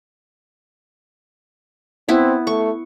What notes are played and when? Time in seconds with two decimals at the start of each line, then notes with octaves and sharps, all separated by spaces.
2.09 B3 C4 E4
2.47 A3 C#6